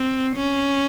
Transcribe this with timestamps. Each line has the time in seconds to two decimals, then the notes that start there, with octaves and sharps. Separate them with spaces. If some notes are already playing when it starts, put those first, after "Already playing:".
Already playing: C4
0.36 C#4